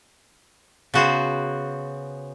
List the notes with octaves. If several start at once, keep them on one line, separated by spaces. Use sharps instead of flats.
C#3 B3 F#4 C5